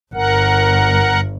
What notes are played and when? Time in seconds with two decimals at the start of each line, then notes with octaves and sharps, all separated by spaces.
0.14 G1 A#4 F#5